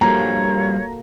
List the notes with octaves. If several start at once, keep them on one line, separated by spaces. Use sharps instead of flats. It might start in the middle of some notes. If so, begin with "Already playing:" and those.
G2 F3 G3 A#3 F#4 A4 C#5 A#5